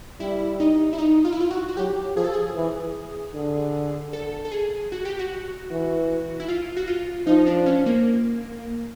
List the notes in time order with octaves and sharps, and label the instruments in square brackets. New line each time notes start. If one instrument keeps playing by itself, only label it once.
[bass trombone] G3 [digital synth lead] E4
[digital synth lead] D#4
E4
D#4
F4
E4
F4
F#4
F#4
[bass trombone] F#3 [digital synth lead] G4
[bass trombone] F3 [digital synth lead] G#4
[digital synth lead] A4
G#4
[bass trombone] E3
D3
[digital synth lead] A4
A4
G#4
F#4
G4
F#4
[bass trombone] E3
[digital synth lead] E4
F4
F#4
F4
[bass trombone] F3 [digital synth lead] D#4
[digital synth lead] D4
C#4
A#3